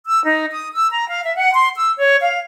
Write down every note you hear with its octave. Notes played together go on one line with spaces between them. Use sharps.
E6
D#4
D#6
E6
A#5
F5
E5
F#5
C6
E6
C#5
F5